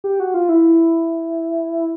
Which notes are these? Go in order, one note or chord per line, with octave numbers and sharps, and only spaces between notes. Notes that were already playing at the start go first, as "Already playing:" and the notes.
G4
F#4
F4
E4